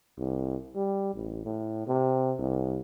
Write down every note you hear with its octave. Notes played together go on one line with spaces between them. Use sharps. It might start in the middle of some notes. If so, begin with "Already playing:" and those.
C2
G3
A1
A2
C3
C2